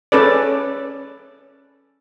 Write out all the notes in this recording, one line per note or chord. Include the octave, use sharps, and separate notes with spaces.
C#4 A4 B4 D5